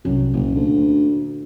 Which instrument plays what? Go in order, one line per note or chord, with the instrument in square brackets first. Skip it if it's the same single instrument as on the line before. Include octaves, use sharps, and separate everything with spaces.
[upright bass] C2 [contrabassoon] F#2
[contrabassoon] F#1 [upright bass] A#2
[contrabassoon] D2